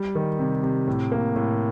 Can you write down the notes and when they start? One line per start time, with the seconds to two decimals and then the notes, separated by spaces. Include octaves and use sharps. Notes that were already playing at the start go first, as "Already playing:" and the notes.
Already playing: G3
0.15 D#3
0.39 C3
0.63 C3
0.87 A2
1.12 A#3
1.36 A2